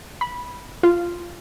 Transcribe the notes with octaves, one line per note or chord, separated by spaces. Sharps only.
B5
F4